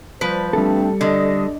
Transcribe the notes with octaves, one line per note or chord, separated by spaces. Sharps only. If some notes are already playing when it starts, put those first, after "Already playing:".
F3 G3 B4 C5
G3 A3 C4 D4 A4
D3 D#5